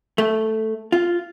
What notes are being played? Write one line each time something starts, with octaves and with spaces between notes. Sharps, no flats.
A3
F4